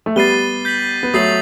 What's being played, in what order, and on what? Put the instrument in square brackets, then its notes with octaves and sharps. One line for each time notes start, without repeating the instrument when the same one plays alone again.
[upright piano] A3
[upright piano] G3 B3 [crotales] A6 C7 D#7 G7
[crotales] G6 B6 F#7
[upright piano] B3
[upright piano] F#3 A3 [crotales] D#6 A6 C7 F#7